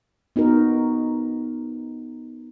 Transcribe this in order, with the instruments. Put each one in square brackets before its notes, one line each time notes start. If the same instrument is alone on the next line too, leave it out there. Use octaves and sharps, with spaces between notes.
[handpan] B3 D#4 F#4 A#4